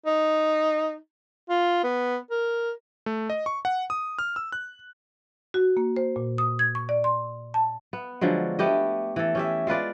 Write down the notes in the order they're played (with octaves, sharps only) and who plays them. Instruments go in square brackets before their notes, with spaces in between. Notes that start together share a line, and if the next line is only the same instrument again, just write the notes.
[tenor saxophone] D#4
F4
B3
A#4
[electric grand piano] A3
D#5
C#6
F#5
D#6
F6
E6
F#6
[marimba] F#4
A#3
C5
A#2
D#6
G#6
C#6
D5
C6
A5
[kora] B3
D3 F3 F#3 G#3
A3 B3 G4 D#5
E3 A4
C#4 G4 E5
G#3 F4 B4 D5